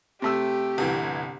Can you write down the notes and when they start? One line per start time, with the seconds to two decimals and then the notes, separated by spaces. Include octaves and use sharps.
0.22 C3 A3 G4 E6
0.78 G1 C2 E3